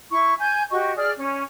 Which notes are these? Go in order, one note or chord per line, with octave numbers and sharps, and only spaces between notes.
E4 C#6
G#5 G6
F#4 G4 D#5 C#6
G#4 D5 F6
C#4